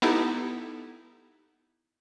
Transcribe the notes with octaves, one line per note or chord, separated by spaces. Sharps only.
B3 D#4 E4 G4 A4